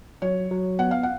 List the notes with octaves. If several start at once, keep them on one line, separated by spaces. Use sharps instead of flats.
F#3 C#5
F#3
B3 F#5
F5
F#5